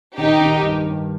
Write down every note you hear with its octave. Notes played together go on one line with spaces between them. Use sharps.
D#3 D#4 G4
D#3
G2
G2